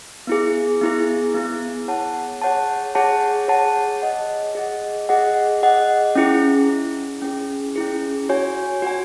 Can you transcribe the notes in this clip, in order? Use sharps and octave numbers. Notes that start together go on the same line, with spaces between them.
B3 E4 G#4
B3 E4 G#4
B3 E4 G#4
G#4 C#5 F#5 A5
G#4 C#5 F#5 A5
G#4 C#5 F#5 A5
G#4 C#5 F#5 A5
G#4 D#5 F#5
G#4 D#5 F#5
G#4 D#5 F#5
G#4 D#5 F#5
C#4 E4 G#4
C#4 E4 G#4
C#4 E4 G#4
C#4 E4 G#4
F#4 C#5 G#5
F#4 C#5 G#5